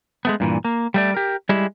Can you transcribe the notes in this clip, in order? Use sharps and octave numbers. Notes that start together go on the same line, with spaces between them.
G#3 A3 B3
G2 A#2 E3
A#3
G3 A3 D5
G4 A#4
G3 G#3 E4 G4